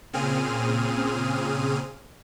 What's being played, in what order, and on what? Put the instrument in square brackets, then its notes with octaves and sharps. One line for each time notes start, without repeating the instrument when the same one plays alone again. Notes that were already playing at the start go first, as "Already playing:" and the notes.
[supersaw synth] A#2 C#3 C4 G#4 F6 D#7